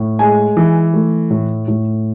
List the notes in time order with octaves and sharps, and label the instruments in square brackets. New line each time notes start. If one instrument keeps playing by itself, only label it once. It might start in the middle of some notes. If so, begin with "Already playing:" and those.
Already playing: [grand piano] A2
G#3 G#5
E3
A3
A2
A2